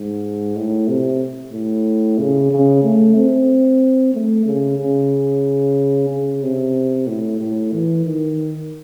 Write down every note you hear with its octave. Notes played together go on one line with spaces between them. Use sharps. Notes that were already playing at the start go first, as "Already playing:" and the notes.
Already playing: G#2
A2
C3
A2
C#3
C#3
A3
C4
A3
C#3
C#3
C#3
C3
A2
A2
E3
D#3